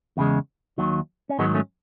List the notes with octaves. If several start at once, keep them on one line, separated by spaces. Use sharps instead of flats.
E2 C#3 G#3
D#2 D#3 F#3
C#4
G#2 D#3 F#3 G#3 B3
A3 C#4